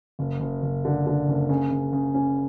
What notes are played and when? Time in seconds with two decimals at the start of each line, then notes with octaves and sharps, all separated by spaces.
0.19 F#1
0.40 F#1
0.62 F#1
0.85 D3
1.06 D3
1.28 F#1
1.49 C#3
1.71 C#3
1.93 C#3
2.14 C#4